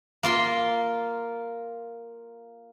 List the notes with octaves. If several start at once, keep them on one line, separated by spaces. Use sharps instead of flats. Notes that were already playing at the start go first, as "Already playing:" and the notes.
A#3 F4 C6